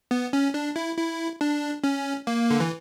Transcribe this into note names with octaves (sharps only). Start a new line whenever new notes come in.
B3
C#4
D4
E4
E4
D4
C#4
A#3
D3
E3